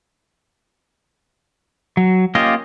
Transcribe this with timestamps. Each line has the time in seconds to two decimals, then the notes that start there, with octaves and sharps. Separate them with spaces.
1.97 F#3
2.35 A#3 C#4 F4 G4 D#5